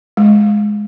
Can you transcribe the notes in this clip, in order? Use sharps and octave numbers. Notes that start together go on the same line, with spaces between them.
G#3